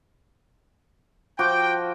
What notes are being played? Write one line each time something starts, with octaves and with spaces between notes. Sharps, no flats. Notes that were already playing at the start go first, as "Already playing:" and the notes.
F3 F#4 G5 D6